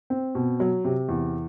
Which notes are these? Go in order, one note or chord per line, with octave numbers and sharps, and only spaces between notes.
C4
B2
F#3
C3
E2